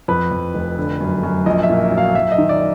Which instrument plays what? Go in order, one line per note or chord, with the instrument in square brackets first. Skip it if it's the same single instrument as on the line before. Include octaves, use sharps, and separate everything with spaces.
[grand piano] F2 B4
F2
F1
D3
F#2
F#2
A#1 D#5
E5
A#2
F#3
F5
F#2 E5
D#5
D#3
D5